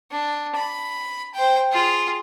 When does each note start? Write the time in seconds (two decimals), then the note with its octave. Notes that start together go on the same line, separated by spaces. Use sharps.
0.11 D4
0.56 B5
1.34 C5 G5
1.72 F4 G#4